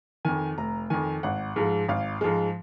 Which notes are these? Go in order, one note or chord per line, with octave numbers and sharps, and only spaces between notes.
F2 D#3 G#5
F1 A#5
F2 D#3 G#5
G#1 F#5
G#2 F3 G#3
G#1 F5
G#2 F3 G#3